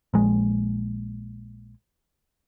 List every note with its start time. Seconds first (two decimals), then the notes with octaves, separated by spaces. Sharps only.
0.14 A#1 G#3